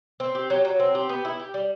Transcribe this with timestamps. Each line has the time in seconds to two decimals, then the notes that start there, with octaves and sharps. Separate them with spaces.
0.20 C4
0.35 G4
0.50 F#3
0.65 F#3
0.80 C4
0.95 G4
1.09 B3
1.25 E4
1.40 G4
1.54 G3